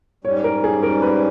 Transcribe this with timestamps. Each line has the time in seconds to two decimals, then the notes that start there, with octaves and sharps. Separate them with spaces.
0.24 G#2 G3 C#4 C#5
0.44 A#4
0.64 G#4
0.83 A#4
1.02 B4